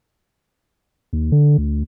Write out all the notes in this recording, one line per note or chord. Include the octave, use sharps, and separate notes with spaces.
D#2
D3
D2